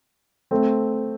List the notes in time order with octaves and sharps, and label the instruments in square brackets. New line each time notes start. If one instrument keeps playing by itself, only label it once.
[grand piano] A3 C4